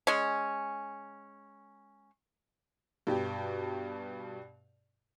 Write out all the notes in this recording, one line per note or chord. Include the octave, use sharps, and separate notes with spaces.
G#3 C#4
G2 B2 G4